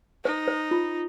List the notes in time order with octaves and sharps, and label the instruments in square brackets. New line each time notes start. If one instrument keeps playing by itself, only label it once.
[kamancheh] D#4 [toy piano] C5
[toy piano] C5
F4